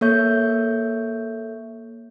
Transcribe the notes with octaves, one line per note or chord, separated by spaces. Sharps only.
A#3 A4 C#5 E5 C#6 G6